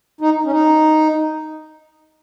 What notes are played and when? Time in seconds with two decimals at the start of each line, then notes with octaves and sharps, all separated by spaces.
0.21 D#4
0.45 C#4
0.52 D#4